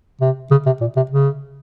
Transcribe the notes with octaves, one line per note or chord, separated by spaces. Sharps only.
C3
C#3
C3
A#2
C3
C#3